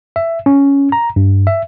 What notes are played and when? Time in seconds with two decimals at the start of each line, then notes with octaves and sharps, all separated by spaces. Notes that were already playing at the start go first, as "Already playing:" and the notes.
0.16 E5
0.46 C#4
0.92 A#5
1.16 G2
1.47 E5